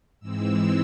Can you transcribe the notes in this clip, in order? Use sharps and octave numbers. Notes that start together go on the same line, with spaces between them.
G#2 E3 G#3 C4 E6